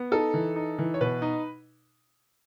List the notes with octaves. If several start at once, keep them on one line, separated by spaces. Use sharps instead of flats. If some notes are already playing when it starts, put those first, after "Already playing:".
Already playing: B3
D#4 A4
E3
D#4
E3
C#5
B2 B4
D#4